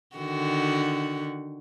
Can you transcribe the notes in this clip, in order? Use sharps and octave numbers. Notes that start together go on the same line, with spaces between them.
D3 D#3 F#4